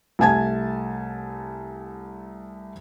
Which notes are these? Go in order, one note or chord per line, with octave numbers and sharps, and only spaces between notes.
C2 A3 G#5 A5 G#6